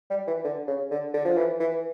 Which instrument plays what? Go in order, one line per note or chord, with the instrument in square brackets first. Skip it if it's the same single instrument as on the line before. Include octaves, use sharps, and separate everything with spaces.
[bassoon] G3
E3
D3
C#3
D3
D3
F3
E3
E3